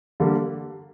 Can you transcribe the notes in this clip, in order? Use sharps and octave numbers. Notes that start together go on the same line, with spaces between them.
D3 G3 A#3